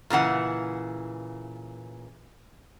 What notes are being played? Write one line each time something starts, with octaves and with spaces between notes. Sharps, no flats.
A#2 C#3 E3 F#5